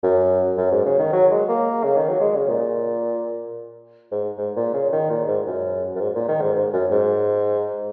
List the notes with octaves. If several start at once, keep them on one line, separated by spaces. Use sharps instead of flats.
F#2
F#2
G#2
C#3
D#3
F#3
G#3
A#3
C#3
D#3
F#3
G#3
C#3
A#2
G#2
G#2
A#2
C#3
D#3
A#2
G#2
F#2
F#2
G#2
A#2
D#3
G#2
G#2
F#2
G#2